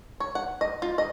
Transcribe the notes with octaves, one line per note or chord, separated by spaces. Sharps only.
C#5
F#5
D#5
F4
D#5